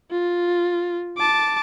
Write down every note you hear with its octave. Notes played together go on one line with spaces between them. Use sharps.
F4
A5 D6